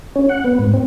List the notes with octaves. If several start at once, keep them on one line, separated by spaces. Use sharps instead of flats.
C#4
F#5
B3
G#2
C4